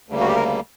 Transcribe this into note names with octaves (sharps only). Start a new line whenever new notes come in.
D2 C#3 G3 A#3
F#4
G4
A#4